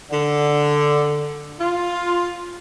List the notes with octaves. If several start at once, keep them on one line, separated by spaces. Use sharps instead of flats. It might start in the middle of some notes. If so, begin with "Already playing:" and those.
D3
F4